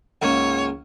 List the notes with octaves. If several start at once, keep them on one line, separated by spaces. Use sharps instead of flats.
C#2 G#2 A#3 C#5